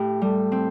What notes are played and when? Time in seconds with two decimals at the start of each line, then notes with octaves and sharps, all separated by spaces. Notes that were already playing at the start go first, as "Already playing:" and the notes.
Already playing: A2 G4
0.22 G3 A4
0.52 C4